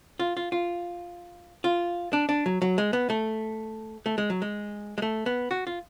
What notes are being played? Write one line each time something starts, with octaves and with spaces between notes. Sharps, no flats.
F4
F4
F4
F4
D4
D4
F#3
F#3
G#3
B3
A3
A3
G#3
F#3
G#3
G#3
A3
B3
F#4
F4